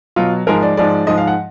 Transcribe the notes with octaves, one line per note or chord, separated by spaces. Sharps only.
B2 F#3 F4
G#2 F3 G#3 A#4
D5
G#2 F3 G#3 D5
G#2 F3 G#3 D#5
F5
F#5